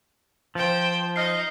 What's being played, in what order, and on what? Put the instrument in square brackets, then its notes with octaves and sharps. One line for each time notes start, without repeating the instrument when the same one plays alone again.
[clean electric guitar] F3 [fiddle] C5 G5
[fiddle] D#4 D#5 [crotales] F6 C7